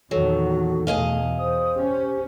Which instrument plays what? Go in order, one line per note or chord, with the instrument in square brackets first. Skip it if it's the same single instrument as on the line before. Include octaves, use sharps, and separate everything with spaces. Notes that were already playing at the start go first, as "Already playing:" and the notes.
[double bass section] E2 A#2 D#3 [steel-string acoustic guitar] F#3 [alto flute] F#4 [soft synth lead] A4
[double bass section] E2 B2 [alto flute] A3 [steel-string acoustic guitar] G#4 D#5 F5
[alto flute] C5 [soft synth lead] D#6
[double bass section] C#4 [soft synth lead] G4